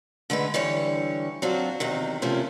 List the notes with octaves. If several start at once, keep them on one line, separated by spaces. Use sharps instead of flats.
D3 G#3 A3 B4
D3 E3 G3 C#5
F#3 C4 D4 F4 F#4
E2 C3 D#3
E2 C3 F3 A3 A#3 C#4